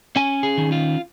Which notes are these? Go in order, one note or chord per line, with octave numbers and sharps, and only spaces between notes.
C#4 G#5
G#4
D#3
F4